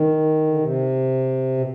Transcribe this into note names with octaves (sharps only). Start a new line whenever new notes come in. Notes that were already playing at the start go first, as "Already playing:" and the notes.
Already playing: D#3
D3
C3
B2